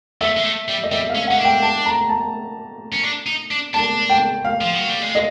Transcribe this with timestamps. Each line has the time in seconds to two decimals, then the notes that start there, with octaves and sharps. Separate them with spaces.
0.21 A3 E5
0.37 G#3
0.44 A3
0.68 G3
0.83 D#5
0.91 G3 E5
1.09 F5
1.15 C#4
1.27 C#4 F#5
1.38 D4
1.45 G5
1.62 A5
1.86 A#5
2.09 A5
2.93 C#4
3.03 D4
3.26 D#4
3.51 D4
3.74 D4 A5
4.10 G5
4.45 F5
4.61 F3
4.75 F#3
4.88 G3
5.02 G#3
5.15 D#5